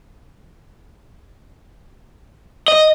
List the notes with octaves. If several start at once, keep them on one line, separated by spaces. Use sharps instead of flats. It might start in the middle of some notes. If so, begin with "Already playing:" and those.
D#5